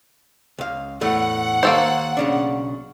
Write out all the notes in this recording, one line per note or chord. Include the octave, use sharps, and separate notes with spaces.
C#2 F5
E2 A2 A3 F#5
D#2 A#3 A4 C5 C#5 C6
B1 C#3 D4